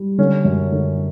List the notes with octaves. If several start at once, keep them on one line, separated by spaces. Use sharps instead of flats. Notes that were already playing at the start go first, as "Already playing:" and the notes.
Already playing: G3
D3 C#4
F#2
D3